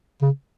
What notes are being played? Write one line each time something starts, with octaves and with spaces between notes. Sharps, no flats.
C#3